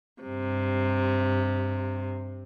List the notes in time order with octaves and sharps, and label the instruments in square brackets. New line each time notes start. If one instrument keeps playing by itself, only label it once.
[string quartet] G2 C3